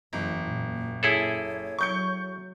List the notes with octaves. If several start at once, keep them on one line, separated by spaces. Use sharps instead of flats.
F#1 E2
A#2
E4 G#4 A4 C#5
F#3 C#6 G6 C#7